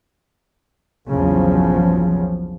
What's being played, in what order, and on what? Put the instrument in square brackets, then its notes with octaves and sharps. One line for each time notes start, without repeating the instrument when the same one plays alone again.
[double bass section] A#1 E2 G2 C#3 F3 F#3